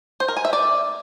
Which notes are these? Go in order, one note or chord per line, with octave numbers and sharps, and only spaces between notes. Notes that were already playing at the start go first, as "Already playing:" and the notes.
C5
A#4
G#5
E5
D5